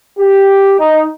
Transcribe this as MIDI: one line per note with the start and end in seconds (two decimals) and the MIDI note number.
0.18 0.71 67
0.78 1.04 63